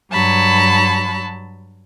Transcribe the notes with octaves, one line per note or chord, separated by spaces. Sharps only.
G2 F#3 A5 B5